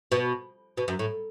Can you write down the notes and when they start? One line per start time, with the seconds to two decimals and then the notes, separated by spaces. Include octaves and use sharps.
0.12 B2
0.77 B2
0.88 F#2
0.99 A2